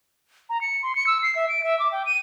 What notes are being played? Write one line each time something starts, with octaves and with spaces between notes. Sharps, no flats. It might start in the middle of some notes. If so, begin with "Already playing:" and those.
A#5
C#7
C6
C#7
E6
C7
E5
D7
E5
D6
G5
D#7